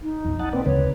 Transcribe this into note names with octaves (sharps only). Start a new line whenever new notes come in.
D#4
B1 F2
D#5 F#5 A5
A#3 C4 B4 D5
D2 C#3 G#3 B3 B4 C#5